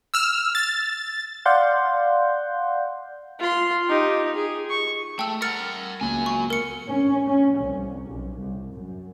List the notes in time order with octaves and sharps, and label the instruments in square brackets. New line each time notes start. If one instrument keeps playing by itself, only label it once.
[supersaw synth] E6 F6
A6
[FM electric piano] D5 F5 F#5 C6 G6
[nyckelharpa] F4 C6
D#4 G4
G#4
C#6
[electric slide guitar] A3 [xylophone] G5 E6
[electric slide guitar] A#4 F#5 [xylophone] F6 A6 C#7
[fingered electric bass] C#2 A#3 B3 [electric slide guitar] F#3 G#5
[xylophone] C#6
A#4 C#7
[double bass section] C#4
C#4
C2
B1
C2
F#2